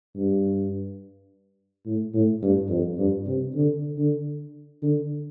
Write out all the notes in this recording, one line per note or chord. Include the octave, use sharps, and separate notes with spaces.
G2
A2
A2
G2
F2
G2
C3
D3
D3
D3